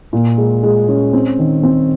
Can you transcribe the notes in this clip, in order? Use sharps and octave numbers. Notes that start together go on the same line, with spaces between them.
A#2
G#3
G#3
C#4
C4
D#3
C4